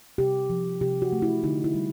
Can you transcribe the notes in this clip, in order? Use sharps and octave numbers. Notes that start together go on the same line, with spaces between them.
C3 G4
F3
C3 G4
F#4
A3
E4
D3 D#4
E4
G3